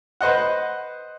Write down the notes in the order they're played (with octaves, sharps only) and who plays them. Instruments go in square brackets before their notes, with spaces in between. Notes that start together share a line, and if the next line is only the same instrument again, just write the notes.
[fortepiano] B4 C5 D#5 F#5